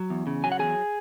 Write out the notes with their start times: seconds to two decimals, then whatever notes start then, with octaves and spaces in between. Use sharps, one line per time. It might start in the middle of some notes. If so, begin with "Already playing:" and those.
Already playing: F#3
0.10 E2
0.27 C#3
0.44 F#3 G#5
0.52 F#5
0.59 E2 G#4 G#5